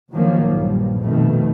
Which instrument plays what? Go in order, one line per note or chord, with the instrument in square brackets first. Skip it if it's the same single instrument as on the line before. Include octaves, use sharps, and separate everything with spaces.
[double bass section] D2 A#2 D#3 F3 F#3 A#3
A#1 G2
F2 B2 D#3 A3